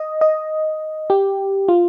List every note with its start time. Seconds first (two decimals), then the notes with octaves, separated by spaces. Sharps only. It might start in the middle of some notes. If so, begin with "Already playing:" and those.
Already playing: D#5
0.21 D#5
1.10 G4
1.68 F4